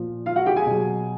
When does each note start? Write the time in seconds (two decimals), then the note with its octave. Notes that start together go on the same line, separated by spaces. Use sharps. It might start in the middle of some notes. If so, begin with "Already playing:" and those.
Already playing: A#2 F3
0.26 F4 F5
0.36 F#4 F#5
0.46 G4 G5
0.56 G#4 G#5
0.66 B2 F#3